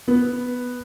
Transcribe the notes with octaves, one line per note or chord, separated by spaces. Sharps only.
B3